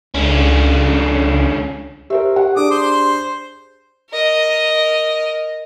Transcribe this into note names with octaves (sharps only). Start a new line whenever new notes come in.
C#2 D3 C#4
G4 A#4 C5 E5
G4 F#5
D4 G#4 D6 D#6
C5 C6
A#4 D#5